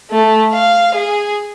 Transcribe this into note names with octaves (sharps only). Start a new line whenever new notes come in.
A3
F5
G#4